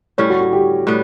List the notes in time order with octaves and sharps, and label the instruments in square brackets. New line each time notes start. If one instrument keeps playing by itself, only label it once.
[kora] A2 G3 C#4 [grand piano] C#5
[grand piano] F#4
F#4
G4
[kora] A2 G3 B3